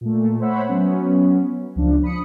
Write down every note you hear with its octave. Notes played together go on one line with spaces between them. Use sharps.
A#2 A3
C5 C#5 E5 F#5 B5
F#3 B3 C#4
C#2 F3 D4
B5 D#6 C#7